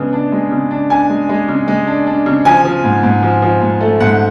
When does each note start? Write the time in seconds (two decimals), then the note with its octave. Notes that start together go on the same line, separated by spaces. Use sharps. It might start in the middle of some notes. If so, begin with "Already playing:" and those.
Already playing: C#3 G#3 B3 D4
0.13 D4
0.32 G#3
0.52 C#3
0.71 D4
0.90 D4 G#5
1.10 G#3
1.29 G#3
1.48 C#3
1.68 G#3
1.87 D4
2.07 D4
2.26 C#3
2.45 F3 G#5
2.65 F3
2.84 G#2
3.03 G#2
3.23 F3
3.42 F3
3.61 G#2
3.81 A3
4.00 G#2 F#5